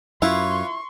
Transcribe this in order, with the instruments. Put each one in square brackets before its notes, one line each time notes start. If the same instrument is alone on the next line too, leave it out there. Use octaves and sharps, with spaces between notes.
[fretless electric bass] F#2 [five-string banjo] E4 [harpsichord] F4 B4 C#5 [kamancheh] C6 C#6